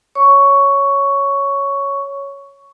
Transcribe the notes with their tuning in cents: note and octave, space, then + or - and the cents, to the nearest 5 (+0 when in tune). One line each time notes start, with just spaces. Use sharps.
C#5 +0 C#6 +10